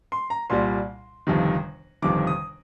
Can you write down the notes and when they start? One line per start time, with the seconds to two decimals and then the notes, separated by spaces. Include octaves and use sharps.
0.12 C6
0.30 A#5
0.50 C2 A#2 G3 C6
1.27 G1 F2 C3 D#3
2.02 G1 F2 C3 D#3 D6
2.27 D#6